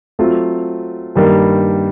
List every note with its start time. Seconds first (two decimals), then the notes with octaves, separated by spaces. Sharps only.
0.19 F#3 A3 C4 F4
1.15 G2 D#3 G3 A#3